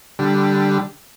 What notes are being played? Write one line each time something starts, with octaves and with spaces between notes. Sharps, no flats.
D3 G3